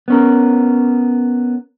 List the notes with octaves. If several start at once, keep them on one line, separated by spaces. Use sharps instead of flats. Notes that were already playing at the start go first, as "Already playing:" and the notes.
B3 C#4 A#4